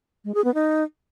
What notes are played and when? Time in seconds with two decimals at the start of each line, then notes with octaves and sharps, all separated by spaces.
0.25 G#3
0.35 G#4
0.44 B3
0.54 D#4